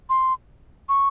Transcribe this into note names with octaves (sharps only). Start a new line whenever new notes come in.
C6
C#6